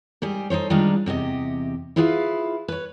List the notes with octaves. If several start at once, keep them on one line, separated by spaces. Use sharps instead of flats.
G#2 G3 G4 G#4
D#4 A4 C5 C#5
D#3 G3 G#3 D4 D#4 F4
E2 C3 G4 D#5
E4 F4 G#4 B4 E5 F5
B4 C#5